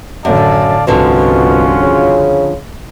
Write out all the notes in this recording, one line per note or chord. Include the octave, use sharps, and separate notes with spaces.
F#2 A2 D3 D5 F5 A5
C2 G2 B2 D3 F3 C#4 F4 F#4
C#3